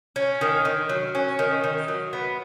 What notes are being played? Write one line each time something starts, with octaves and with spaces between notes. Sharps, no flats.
C#4
D#3
D#3
F#3
C#4
D#3
D#3
F#3
B3